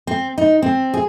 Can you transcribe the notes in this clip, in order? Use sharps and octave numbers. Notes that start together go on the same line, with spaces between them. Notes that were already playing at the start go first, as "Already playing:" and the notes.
C4
D#4
C4
G#4